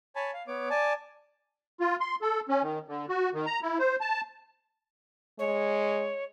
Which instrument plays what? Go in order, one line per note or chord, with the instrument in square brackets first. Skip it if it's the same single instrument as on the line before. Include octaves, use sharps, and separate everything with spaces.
[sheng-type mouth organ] C#5 G#5 A5 B5
F5
B3 C#5 D6
D5 G#5 A5
[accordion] F4
C6
A4
C#4
D#3
D3
F#4
D#3
A#5
E4
C5
A5
[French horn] G#3 [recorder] C#5